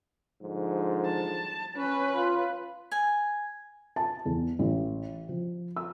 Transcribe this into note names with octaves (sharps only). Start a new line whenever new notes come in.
G#2 D3 F3
A5
C#4 B4
F4
G#5
A5
E2
A1
F3
E6